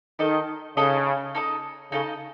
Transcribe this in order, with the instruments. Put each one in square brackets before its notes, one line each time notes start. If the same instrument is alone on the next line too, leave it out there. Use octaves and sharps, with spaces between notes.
[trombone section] D#3 [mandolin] D#4 A4 D#5
[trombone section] C#3 [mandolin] D#4 A4 D#5
[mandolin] D#4 A4 D#5
[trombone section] C#3 [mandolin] D#4 A4 D#5